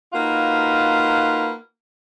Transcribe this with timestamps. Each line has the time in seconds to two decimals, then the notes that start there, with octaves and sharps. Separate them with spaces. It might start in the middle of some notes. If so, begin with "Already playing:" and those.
0.13 A#3 D#4 F4 F#4 B4